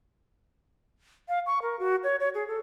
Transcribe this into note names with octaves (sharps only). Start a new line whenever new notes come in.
F5
C#6
A#4
F#4
C#5
C#5
G#4
A4